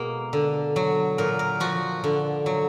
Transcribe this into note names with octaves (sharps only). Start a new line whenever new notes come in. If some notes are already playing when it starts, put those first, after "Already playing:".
Already playing: B2 G#3 A#3
D3
F#3
A#2 A#4
A#4
F3 F#4
D3
F#3